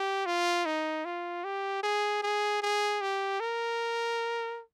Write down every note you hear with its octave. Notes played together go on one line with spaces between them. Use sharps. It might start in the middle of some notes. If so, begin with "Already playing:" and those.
Already playing: G4
F4
D#4
F4
G4
G#4
G#4
G#4
G4
A#4